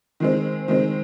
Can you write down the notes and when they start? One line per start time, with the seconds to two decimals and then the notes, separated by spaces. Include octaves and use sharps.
0.20 D#3 G#3 C4
0.68 D#3 G#3 C4